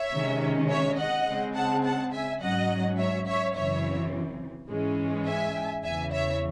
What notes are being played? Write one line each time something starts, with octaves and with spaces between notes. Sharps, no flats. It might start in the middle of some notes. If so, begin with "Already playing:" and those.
Already playing: C#5 E5
C3 D#3 G#3 C#4
C#5 E5
D#5 F#5
C#3 G#3 C4
F#5 A5
F#5 A5
E5 G#5
G#2 F#3 C#4 D#5 F#5
C#5 E5
C#5 E5
F#2 C#3 E3 C4 C#5 E5
G#2 E3 G#3 C#4
E5 G#5
E2 C#3 E3 E5 G#5
C#5 E5